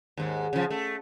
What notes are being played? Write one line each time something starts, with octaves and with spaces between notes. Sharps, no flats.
D#2 G#2
C#3 F3
A3